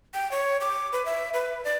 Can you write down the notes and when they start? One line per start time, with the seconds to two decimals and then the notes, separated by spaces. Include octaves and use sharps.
0.14 G5
0.32 C#5
0.61 D6
0.93 B4
1.05 E5
1.34 B4
1.64 D5